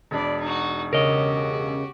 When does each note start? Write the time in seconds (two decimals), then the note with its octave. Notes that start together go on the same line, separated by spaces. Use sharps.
0.11 E1 D4 D5 B5
0.40 D#4 F#4
0.93 C#3 F#4 G4 A#4 C#5 D#5